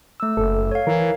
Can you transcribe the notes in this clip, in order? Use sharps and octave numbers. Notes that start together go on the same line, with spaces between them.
A3 E6
F#1 A4
C#5 F5
E3 A#4